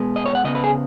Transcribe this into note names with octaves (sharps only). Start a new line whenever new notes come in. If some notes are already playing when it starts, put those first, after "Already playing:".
Already playing: B2 G#3 B3
D#5
C#5
F#5
C#3 B3 D#5
B4
G#4